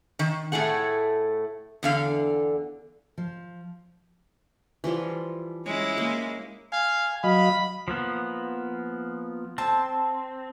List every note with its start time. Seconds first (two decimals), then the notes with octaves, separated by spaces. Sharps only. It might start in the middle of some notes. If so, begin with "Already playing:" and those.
0.19 D#3
0.52 A2 A3 E4 G#4 F#5
1.83 E2 D3 F5
3.18 F3
4.84 E3 F3 G3
5.66 G#3 C#4 E4 C#5
5.98 A#3
6.72 F5 G#5
7.24 F#3 D#5 F5 B5
7.88 F3 A#3 B3
9.58 C4 A5